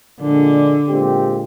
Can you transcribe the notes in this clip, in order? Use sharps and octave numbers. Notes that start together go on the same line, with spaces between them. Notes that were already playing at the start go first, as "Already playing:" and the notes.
A#1 A#2 D3 G#3 D4
A#2 G#3 C4 G4